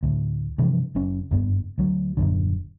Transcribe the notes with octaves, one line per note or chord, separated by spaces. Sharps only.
D2 A2
G2 C3 E3 F3
F#1 F#2 C#4
F#1 G2 B3
D2 F#3
D#1 G#1 F#2 D3